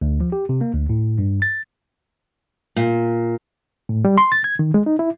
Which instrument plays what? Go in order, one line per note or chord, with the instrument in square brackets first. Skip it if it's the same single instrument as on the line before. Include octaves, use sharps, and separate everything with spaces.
[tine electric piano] D2
F3
G4
C3
A#3
D2
A2
G2
A6
[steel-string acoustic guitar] A#2
[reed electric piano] A2
G3
C6
A6
G#6
D#3
G#3
D#4
E4